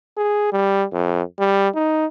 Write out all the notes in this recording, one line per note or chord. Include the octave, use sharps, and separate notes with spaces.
G#4
G3
F2
G3
D#4